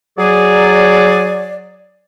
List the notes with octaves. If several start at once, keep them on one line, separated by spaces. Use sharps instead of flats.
F#3 G#4 D5